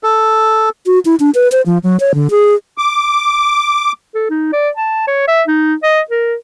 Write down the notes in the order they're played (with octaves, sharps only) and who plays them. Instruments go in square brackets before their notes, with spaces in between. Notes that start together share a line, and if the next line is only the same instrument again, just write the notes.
[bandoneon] A4
[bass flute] F#4
E4
D4
B4
C5
F3
F#3
C#5
D3
G#4
[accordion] D6
[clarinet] A4
D#4
D5
A5
C#5
E5
D#4
D#5
A#4